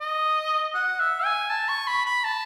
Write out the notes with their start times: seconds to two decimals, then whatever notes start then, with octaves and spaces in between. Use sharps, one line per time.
0.01 D#5
0.75 F#5
1.00 E5
1.25 G#5
1.50 A5
1.68 C#6
1.87 B5
2.06 B5
2.24 A5